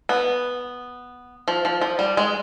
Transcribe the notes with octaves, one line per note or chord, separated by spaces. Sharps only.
B3
F3
F3
F3
G3
G#3